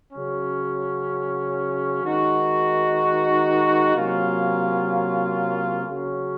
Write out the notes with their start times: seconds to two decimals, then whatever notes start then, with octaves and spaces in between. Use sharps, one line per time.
0.12 C#3 F#3 C#4
2.04 D#3 G#3 D#4 F#4
3.95 C3 F#3 A#3 C#4 F4
5.87 C#3 F#3 C#4